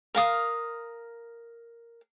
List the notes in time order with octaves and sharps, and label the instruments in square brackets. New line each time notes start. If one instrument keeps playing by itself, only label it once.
[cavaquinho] A#4 F5 D#6